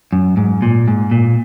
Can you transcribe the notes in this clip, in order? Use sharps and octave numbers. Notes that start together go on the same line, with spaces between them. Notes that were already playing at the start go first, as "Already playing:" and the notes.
F#2
G#2
A#2
G#2
A#2